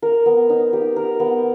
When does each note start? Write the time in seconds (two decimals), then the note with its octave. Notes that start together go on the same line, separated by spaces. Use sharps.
0.02 A#4
0.26 B3
0.50 D#4
0.73 G4
0.96 A#4
1.20 B3